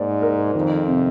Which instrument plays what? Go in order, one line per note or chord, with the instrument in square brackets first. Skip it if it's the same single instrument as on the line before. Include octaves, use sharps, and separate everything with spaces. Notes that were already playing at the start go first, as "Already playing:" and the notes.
Already playing: [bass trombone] G#2 [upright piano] A#3 D5
[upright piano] A#4
[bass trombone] F2 [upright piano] D#3
[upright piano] C3